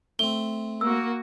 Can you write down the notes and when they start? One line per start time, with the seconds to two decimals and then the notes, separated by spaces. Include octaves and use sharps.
0.19 A3 C4 G7
0.81 A#3 F#4 E6